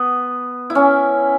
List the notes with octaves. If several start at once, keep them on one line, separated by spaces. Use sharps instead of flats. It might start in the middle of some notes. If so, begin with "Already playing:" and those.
Already playing: B3
E4
C#4